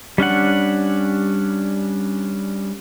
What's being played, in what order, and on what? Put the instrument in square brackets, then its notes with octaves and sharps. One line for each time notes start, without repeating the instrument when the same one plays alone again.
[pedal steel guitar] G3 C#4 D4 F#5